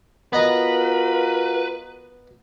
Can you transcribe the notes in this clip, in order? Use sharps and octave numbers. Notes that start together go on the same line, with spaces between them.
B3 F4 F#4 A#4 B4 D#5 A#5